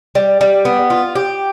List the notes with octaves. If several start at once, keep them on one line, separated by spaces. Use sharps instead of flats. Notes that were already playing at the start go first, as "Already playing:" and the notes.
G3
G3
B3
F4
G4